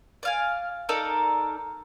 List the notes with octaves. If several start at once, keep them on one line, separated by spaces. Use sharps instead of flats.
D5 F5 G#5
D#4 A4 A#4 D5